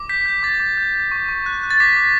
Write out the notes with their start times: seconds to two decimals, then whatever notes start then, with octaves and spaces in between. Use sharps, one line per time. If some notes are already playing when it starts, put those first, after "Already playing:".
Already playing: D6
0.09 G6 B6
0.26 G6
0.43 D6 A6
0.60 D6
0.77 G6
0.94 G6
1.11 C#6
1.28 C#6
1.46 F#6
1.63 F#6
1.71 A6
1.80 D6 B6
1.97 D6